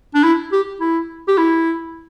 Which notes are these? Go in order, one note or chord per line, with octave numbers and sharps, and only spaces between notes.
D4
E4
G4
E4
G4
E4